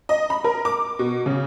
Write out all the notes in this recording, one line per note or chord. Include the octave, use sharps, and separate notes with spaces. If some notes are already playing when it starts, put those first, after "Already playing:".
D#5
B5
A#4
D6
B2
C#3